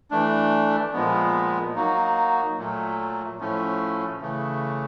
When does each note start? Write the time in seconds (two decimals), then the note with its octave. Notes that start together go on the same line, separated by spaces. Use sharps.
0.11 E3 A3 D4
0.93 A#2 F3 G#3 B3
1.75 F#3 A#3 D#4 F#4
2.57 A#2 F#3 A3
3.39 A2 F3 A3 C#4
4.20 C#3 E3 A3